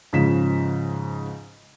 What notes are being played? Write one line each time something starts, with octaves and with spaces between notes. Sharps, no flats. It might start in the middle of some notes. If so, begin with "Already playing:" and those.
G#2 C#3 F3 B6 E7